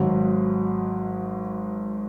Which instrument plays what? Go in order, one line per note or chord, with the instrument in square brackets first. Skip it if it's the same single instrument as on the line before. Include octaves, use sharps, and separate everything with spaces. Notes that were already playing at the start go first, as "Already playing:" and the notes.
Already playing: [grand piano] G#1 G#2 F#3